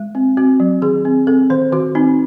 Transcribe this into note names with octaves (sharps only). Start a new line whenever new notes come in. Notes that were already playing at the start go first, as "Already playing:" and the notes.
Already playing: G#3
C4
C4 F#4
F#3
D#3 G#4
C4
C4 A4
D#3 C5
D#3 F#4
C4 D#4